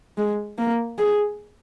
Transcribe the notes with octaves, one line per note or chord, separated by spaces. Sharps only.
G#3
A#3
G#4